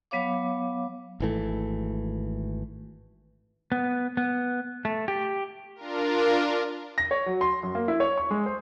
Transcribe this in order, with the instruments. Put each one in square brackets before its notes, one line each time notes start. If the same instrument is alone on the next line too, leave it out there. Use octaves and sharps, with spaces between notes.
[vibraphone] F#3 B3 C#5 F5 D6
[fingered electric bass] G#1 E3 A3
[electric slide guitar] B3
B3
A3
G4
[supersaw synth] D4 F4 A#4
[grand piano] A#6
C#5
F#3
C6
F#2
A#3
E4
C#5
C#6
G#3
C5